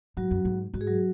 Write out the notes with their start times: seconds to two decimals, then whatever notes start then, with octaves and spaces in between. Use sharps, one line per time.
0.17 G#2 F#3 F#4
0.31 F#2
0.45 G#2
0.74 G#2 F#4
0.81 G#4
0.87 F#3 F#4